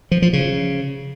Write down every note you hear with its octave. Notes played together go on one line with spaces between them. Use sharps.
F3
F3
C#3